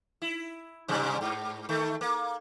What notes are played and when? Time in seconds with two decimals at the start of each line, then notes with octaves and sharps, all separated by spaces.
0.22 E4
0.88 G#2 C3 G3
1.21 G#2
1.69 D#3 A3
2.01 A#3